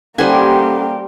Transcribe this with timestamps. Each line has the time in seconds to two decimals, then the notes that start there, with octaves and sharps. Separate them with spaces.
0.18 G3 A#3 C#4 G4 A4 C5 F#5 G#5